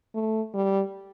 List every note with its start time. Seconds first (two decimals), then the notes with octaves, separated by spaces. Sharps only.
0.15 A3
0.54 G3